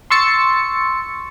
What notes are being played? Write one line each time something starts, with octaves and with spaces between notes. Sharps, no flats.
C6 C#6 E6 A6 C#7